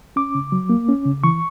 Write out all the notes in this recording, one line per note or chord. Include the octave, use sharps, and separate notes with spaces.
C#4 D6
C#3
F#3
A#3
C#4
C#3
E3 C#6